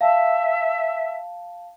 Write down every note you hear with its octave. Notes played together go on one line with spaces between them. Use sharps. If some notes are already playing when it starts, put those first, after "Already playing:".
E5 F5 A5